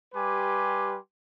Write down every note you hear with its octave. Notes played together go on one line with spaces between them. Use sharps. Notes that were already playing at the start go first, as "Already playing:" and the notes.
G3 G4 B4 G#5 C6 D6